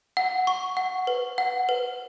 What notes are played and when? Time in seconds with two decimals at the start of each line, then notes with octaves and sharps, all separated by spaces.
0.17 F#5
0.47 C#6
0.77 F#5
1.07 B4
1.38 F#5
1.69 B4